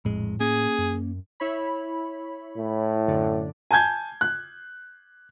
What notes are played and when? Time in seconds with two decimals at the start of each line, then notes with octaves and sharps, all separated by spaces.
0.05 A#1 F2 A2 G#3
0.40 A#3 C#4 G#4
0.78 F#2
1.40 E4 C#5 B5
2.56 A2
3.07 F#2 D3 D5
3.71 G#5 A5 G6 G#6
4.21 F#6